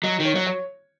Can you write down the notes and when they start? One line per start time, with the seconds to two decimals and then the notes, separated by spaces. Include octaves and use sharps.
0.03 F#3 D#5
0.20 D#3
0.25 C#5
0.35 F#3
0.47 C#5